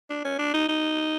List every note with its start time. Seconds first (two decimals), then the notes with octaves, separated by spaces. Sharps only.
0.10 D4
0.24 C#4
0.39 D4
0.54 D#4
0.68 D#4